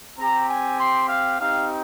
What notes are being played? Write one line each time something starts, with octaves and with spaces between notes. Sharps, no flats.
C4 G4 A#5
G#5
C6
F5
C4 D#4 G4 F5